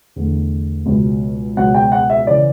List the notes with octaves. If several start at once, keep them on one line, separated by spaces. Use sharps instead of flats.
E2 D3 A3
C#2 B2 F#3
C#2 B2 F#3 F#5
G5
F#5
E5
C#3 E3 D5